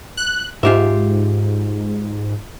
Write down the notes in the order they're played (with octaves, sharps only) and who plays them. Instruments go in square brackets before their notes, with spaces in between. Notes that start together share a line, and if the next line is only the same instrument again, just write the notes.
[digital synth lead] F#6
[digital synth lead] G#2 [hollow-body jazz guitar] F4 G4 E5